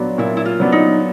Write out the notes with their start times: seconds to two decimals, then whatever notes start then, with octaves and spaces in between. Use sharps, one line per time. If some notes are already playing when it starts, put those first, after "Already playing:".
Already playing: A#2 F#3 B3 D4
0.18 A#2 E4
0.37 E4
0.46 F4
0.60 F#3 B3 D4
0.72 D#4